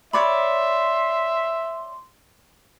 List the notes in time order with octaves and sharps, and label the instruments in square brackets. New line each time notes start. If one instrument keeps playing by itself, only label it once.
[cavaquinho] C#5 D5 B5 [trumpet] E5 [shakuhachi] C6